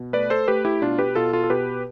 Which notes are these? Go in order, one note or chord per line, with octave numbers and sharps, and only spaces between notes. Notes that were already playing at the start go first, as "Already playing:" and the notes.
Already playing: B2
A3 B4 D5
A4 C5
A3 G4 B4
E4 G4
B2 D4 F4
G4 B4
B2 F4 A4
F4 A4
A4
B2 G4 B4